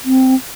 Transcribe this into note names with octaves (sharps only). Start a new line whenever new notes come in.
C4